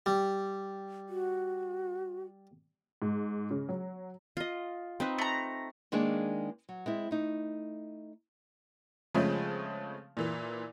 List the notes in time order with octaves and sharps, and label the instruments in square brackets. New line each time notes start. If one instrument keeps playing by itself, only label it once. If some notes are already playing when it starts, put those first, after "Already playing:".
[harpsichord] G3
[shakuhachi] F#4
[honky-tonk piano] G#2
C#3
F#3
[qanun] F4 D#5
C4 D#4 B4
[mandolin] A3 A#5
[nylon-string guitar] D#3 G#3 A#3 D4 G#4
F#3
G#3 C4 E4
A3 D#4
[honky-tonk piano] C#3 F3 G#3 A3 C4 C#4
A#2 E3